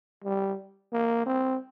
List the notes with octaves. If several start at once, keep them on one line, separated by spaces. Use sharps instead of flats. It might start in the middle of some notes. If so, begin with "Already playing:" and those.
G3
A#3
C4